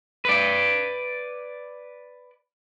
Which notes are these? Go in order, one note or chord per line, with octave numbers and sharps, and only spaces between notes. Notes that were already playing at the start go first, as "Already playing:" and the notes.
B4 D5